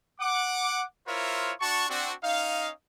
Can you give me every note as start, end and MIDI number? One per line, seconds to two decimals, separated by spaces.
0.21 0.85 78
0.21 0.85 86
1.07 1.53 64
1.07 1.53 65
1.07 1.53 70
1.07 1.53 72
1.07 1.53 73
1.07 1.53 76
1.61 1.88 62
1.61 1.88 66
1.61 1.88 81
1.61 1.88 85
1.89 2.13 60
1.89 2.13 62
1.89 2.13 66
2.24 2.70 61
2.24 2.70 63
2.24 2.70 75
2.24 2.70 77